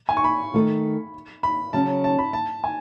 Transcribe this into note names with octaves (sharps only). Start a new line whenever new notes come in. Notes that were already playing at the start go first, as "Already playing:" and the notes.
G#5
C#6
B5
D#3 A3 D#4 A4
B5
C#3 F#3 C#4 A5
A5
B5
A5
G#5